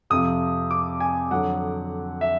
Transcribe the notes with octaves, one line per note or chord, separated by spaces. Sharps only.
F2 C3 F3 D#6
D6
G#5
F2 D3 F#3 F#5
E5